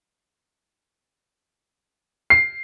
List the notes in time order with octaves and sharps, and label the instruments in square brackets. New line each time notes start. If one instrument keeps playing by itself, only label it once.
[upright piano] C7